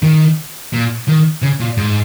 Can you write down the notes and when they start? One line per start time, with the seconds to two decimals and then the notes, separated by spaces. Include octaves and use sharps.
0.03 D#3
0.73 A#2
1.08 D#3
1.43 C#3
1.61 A#2
1.78 G#2